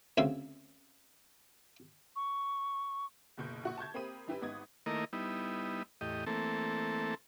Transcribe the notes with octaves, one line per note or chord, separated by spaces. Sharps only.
D2 C#3 C4 E5
C#6
F#1 B2 G6
A#1 F#4 C#6
A5 C#6 G6 G#6
A#3 C4 G4 B5 D#6 D#7
F#2 E4 G4 B4 D#7
G#1 B3 D#4 D#6 G#6
D#3 A3 A#3 E4 A#4 D#5
G3 B3 D#4 E4
E2 A2 G4 D#5
E3 A3 A#3 C4 A4